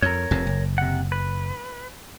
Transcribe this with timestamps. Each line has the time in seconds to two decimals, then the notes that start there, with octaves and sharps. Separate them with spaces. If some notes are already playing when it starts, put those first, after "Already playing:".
0.02 F2 A#4 C#5
0.31 F1 F2 C3
0.47 F#1
0.78 C3 F#5
1.12 B4